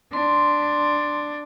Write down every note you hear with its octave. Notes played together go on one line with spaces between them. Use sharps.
D4 C6